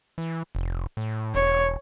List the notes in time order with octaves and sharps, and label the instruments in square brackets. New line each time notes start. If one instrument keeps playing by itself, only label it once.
[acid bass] E3
F1
A2
[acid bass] E1 [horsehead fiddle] C#5